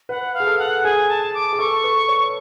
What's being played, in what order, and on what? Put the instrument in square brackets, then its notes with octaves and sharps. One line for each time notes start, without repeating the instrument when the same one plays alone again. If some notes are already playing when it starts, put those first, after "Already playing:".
[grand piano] B4 [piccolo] F#5
[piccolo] F5
[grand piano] G#4
A4
[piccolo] F#5
[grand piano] G#4 [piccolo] G#5
[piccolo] A5
D6
[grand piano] G#4
[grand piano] A4 [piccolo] C#6
[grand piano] B4
C#5